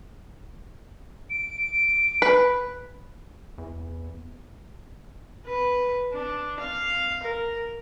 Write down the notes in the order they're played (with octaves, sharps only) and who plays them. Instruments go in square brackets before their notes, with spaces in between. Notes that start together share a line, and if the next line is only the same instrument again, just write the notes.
[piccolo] D7
[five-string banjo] B4
[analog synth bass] E2
[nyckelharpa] B4
D4
F5
A#4